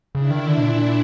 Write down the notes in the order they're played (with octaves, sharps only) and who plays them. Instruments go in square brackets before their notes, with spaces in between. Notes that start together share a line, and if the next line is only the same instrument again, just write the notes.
[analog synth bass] C#3 [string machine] D4 E4
[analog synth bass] D#3
D3
B2
A#2